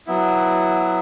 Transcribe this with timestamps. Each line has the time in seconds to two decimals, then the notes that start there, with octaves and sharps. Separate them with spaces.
0.07 F#3 B3 E4